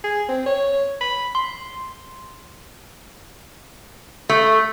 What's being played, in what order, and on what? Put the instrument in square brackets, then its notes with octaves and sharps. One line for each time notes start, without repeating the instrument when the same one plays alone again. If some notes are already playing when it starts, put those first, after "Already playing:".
[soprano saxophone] G#4
C4
C#5
B5
[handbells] C6
[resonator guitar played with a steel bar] A3